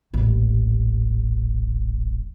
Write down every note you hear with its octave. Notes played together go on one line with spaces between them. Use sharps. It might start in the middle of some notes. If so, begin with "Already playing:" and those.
D#1 A1